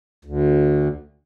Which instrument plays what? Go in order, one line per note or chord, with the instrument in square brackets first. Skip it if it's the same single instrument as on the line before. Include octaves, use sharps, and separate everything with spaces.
[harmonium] D2